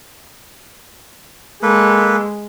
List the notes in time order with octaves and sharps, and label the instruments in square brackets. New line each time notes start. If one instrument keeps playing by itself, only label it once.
[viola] G#3 [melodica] A#3 A4 B4